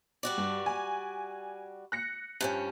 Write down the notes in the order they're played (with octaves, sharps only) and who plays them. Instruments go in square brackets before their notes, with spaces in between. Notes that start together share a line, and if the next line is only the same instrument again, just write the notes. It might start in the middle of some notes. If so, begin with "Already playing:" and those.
[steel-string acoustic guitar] G3 F#4 D5
[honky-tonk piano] G2
G#5
F#6 A#6 C#7
[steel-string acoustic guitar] G2 F3 C#4